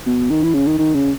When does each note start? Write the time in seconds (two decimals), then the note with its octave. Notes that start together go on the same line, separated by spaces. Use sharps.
0.06 B2
0.30 D#3
0.43 E3
0.54 C#3
0.67 D#3
0.78 D#3
0.94 C#3